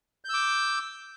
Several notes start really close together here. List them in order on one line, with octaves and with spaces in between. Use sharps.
G6 E6 D6